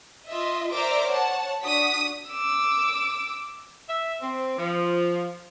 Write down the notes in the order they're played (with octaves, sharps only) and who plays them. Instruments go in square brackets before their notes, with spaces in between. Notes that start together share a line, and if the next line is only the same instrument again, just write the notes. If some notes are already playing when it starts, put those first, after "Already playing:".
[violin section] F4 D#5 E5
A#4 C5 D5 E5 A#5 D6
C#5 F#5 A5
D4 F#4 D#6 B6
[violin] D6 E6
[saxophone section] E5
C4
F3